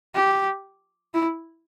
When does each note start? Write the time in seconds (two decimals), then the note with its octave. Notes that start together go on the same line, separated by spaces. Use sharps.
0.15 G4
1.14 E4